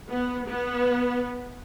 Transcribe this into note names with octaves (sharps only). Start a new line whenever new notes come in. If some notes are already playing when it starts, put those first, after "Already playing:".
B3
B3